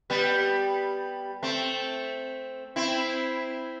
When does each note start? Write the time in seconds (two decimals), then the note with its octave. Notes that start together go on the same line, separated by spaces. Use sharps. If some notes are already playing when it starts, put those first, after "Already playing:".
0.10 G3 B3
1.43 A3 C4
2.76 C4 E4